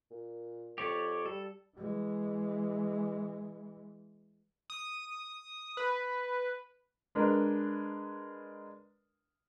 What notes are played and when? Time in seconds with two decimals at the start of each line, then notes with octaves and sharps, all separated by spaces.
0.11 A#2
0.78 F2 G4 C#5 D5
1.26 G3 A4
1.76 E3 G#3
4.70 D#6
5.77 B4
7.15 G#3 D4 A#4 B4